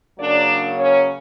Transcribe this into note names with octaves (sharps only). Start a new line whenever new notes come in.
C#3 F#3 A#3 C#4 D4 D5
C#4 C#5